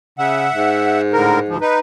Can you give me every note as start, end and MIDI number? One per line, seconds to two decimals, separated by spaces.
0.18 0.48 49
0.18 1.02 76
0.18 1.02 78
0.54 1.57 44
1.13 1.40 45
1.13 1.40 50
1.13 1.40 70
1.48 1.58 38
1.48 1.58 53
1.61 1.79 63
1.61 1.79 71